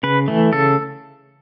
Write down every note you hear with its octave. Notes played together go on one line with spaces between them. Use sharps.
C#3 B4
E3 A3
C#3 A4